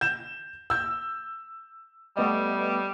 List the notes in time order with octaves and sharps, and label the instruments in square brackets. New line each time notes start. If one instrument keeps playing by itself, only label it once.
[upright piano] G6 E7
E6 G6
[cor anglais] G3 [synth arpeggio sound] A3 B3 D#5